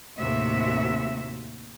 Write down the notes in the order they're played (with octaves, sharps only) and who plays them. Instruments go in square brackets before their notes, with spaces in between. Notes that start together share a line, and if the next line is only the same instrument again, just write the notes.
[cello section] D#2 A2 C3 F#4 E5